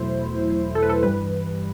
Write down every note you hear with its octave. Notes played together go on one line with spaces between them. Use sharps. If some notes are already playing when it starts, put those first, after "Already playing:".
Already playing: E2 B2 F#3 A3 E4 C5
A4
B4
A4
G2 E3 G3 B4